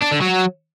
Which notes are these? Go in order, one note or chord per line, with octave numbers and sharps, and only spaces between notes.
D4
D3
F#3